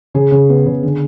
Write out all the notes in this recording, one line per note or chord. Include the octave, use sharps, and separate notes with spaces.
C#3 G#4
C#3
B3
C#3
D3